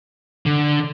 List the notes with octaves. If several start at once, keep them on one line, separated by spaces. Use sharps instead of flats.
D3